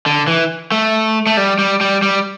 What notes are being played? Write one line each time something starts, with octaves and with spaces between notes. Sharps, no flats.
D3
E3
A3
A3
G3
G3
G3
G3